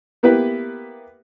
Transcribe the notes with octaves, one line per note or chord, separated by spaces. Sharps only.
A#3 B3 E4 G4 B4